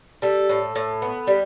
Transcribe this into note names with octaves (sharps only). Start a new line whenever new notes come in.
G3 A4
A2
A2
B3
G3